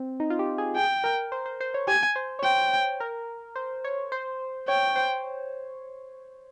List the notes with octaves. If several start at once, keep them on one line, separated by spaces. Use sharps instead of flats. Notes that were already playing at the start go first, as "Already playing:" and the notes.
Already playing: C4
D#4
F4
G4
G#4
G#4 G5
A#4
C5
C5
C5
C#5
G4 G#5
C5
C#5
C5 G5
A#4
C5
C#5
C5
C#5 G5
C5